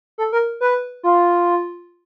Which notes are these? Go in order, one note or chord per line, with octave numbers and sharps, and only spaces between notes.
A4
A#4
B4
F4